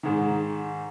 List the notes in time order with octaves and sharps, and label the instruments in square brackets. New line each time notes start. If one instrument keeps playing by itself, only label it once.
[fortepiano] G#2 D#3